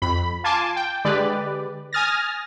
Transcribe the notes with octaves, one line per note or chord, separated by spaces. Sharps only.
F2 B5
F4 G#5 A5 C6 D6
G5
D3 G#3 G4 B4 D5
G#5 D#6 F6 A6 A#6